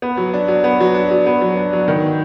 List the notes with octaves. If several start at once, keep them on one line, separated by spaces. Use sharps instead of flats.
B3
F#3
D4
F#3
B3
F#3
D4
F#3
B3
F#3
D4
F#3
D#3